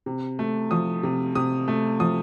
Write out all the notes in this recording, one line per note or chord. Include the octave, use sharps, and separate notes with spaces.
C3
A3
F3 D#6
C3
C3 D#6
A3
F3 D#6